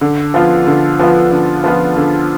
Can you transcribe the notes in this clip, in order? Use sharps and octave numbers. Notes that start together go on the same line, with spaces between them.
D3
F3 B3 F4
D3
F3 B3 F4
D3
F3 B3 F4
D3